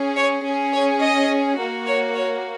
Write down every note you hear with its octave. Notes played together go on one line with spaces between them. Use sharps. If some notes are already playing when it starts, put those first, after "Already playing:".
Already playing: C#4 G#4
C#5
C#4 G#4
C#5
D#5
A#3 F#4
C#5
C#5